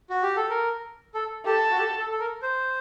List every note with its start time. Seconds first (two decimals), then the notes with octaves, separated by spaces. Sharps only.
0.10 F#4
0.23 G4
0.36 A4
0.50 A#4
1.14 A4
1.46 G4 A4
1.71 F#4
1.78 G4
1.99 A4
2.11 A4
2.20 A#4
2.42 C5